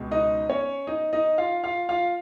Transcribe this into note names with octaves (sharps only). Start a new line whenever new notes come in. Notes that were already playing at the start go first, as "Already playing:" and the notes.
Already playing: C#2 B2 G#3
D#4 D#5
C#4 C#5
D#4 D#5
D#4 D#5
F4 F5
F4 F5
F4 F5